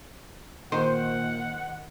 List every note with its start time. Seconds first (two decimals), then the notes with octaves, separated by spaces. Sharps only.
0.72 A#2 D#3 C5 F#5